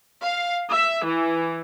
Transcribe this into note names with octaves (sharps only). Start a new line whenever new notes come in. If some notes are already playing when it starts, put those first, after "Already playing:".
F5
E5
E3